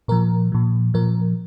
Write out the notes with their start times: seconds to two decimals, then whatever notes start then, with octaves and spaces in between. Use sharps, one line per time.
0.08 A#2 F3 A#4
0.52 A#2 F3
0.94 A#2 F3 A#4